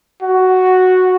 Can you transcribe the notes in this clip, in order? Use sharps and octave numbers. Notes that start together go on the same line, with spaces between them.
F#4